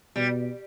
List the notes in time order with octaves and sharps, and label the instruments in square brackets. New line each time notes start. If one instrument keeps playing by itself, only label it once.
[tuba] B2 [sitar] G3